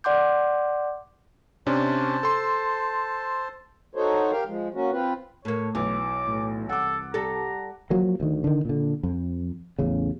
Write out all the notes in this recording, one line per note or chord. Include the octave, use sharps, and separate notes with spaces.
D5 F#5 C6 D6 G6
C3 C#4 D4 C5 A5
A4 C6
D#4 F#4 A4 C5 C#5
G4 A#4 F5 G5
F3 G#3
A#3 C#4 F#4
C4 F4 B4
A2 A3 A#3 C#5
B1 E3 D6
A2
C2 A4 F#5 D6
G3 A4 A#5
F3 F#3 A#3
D2 D#3
D3 D#3
A#2 D3
F2
A1 E2 C#3